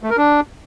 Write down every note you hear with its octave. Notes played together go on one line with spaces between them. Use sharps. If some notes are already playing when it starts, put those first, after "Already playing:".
A3
A#4
D4